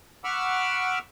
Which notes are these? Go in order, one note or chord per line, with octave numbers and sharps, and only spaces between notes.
F#5 B5 C#6 D6 E6 F6